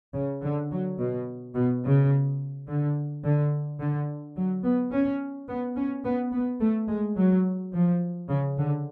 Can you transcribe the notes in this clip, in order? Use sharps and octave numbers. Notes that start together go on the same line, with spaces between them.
C#3
D3
F#3
B2
B2
C#3
D3
D3
D3
F#3
B3
C#4
B3
C#4
B3
B3
A3
G#3
F#3
F3
C#3
D3